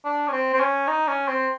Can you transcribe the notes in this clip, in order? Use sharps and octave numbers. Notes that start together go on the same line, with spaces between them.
D4
C#4
C4
C4
C#4
D#4
C#4
C4